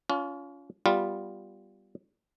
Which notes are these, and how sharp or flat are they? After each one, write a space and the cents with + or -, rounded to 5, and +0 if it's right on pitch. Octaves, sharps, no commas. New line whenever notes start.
C#4 +35 F4 +0
G3 +0 B3 +0 F4 +0